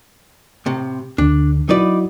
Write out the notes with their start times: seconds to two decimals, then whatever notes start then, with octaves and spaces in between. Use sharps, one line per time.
0.66 A2 C3
1.18 D2 D3 D4
1.69 F#3 D#4 E4 F#4 B4 D5